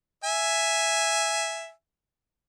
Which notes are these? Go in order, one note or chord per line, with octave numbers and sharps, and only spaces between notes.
E5 G#5